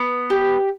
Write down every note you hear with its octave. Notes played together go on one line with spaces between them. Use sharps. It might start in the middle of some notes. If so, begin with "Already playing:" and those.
Already playing: B3
G4